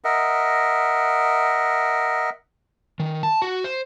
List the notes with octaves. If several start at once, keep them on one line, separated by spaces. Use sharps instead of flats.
A#4 D#5 E5 F#5
D#3
A5
F#4
C5